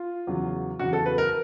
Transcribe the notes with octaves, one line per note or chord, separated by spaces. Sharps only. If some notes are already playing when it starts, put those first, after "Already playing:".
Already playing: F4
E2 C#3 F#3
E2 C#3 F#3 F#4
A4
B4
A#4